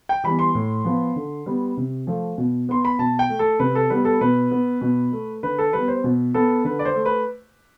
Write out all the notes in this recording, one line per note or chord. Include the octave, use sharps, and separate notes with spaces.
G5
E3 G3 B3 B5
C6
A2
F3 B3
D3
G3 B3
C3
F3 A3
B2
B3 C6
B5
B2 A5
G5
A3
A4
C3 B4
A4
G3 B3 B4
A4
B2 B4
B3
B2
A3
D3 B4
A4
G3 B3 B4
C5
B2
B3 A4
D3 B4
D5
C5
A3
B4